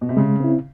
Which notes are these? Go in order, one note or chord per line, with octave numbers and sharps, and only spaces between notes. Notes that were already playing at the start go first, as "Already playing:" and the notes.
B2
C3
C#3 G#3
C4 E4